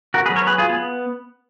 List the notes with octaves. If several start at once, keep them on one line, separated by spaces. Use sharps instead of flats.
F#4 A#4
F#3 B3 G#4 B4
A#4 C#5
G#4 B4
F4 G#4
B3